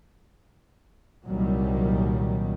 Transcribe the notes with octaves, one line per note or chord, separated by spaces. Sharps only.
C2 A#2 D#3 F#3 G3